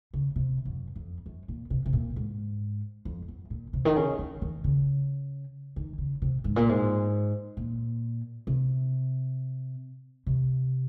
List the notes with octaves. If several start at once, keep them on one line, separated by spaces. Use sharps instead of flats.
C#3
C3
F#2
F2
F#2
A#2
C3
C3
A#2
G#2
F2
F#2
A#2
C3
D#3
C#3
D#3
D#3
C#3
D#3
C#3
C3
G#2
A#2
G#2
A#2
C3
C3